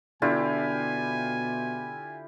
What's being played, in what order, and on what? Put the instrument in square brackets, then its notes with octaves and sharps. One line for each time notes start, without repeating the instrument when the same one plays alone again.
[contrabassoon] B2 [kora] D3 [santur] E4 F4 G4 [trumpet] G#5